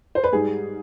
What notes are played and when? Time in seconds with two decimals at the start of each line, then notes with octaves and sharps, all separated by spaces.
0.15 C5
0.24 B4
0.33 G#2 G3 G#4